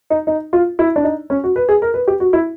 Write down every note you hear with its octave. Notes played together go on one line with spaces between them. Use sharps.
D#4
D#4
F4
E4
D4
D#4
C#4
F#4
B4
G#4
A#4
B4
G4
F#4
E4